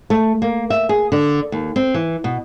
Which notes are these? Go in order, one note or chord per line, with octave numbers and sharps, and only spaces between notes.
A3
A#3
E5
G#4
D3
D#2
C4
E3
B2